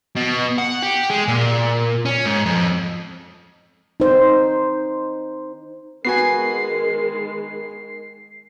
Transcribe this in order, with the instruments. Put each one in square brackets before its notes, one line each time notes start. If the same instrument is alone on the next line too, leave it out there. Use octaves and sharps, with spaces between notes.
[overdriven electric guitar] B2
F#5
G4
G#3
A#2
C#4
G#2
F2
[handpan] D#4 C5
[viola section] D#3 G#3 [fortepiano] B3 F#4 G#5 [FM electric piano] C7